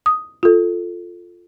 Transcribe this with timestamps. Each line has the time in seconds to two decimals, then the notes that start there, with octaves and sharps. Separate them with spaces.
0.06 D#6
0.43 F4 A4